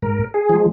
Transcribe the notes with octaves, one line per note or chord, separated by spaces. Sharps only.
G#2 A#4
G#4
F3 G#3